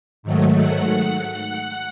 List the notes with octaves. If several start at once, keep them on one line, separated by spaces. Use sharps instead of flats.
G#2 D#3 F#3 A3
F#5
F#5